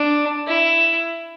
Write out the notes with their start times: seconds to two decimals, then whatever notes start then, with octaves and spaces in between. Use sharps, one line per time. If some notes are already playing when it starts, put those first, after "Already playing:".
Already playing: D4
0.47 E4